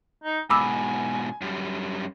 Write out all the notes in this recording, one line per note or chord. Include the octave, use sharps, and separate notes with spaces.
D#4
G#2 B2 G#5 B5 D6 E6
F#2 G3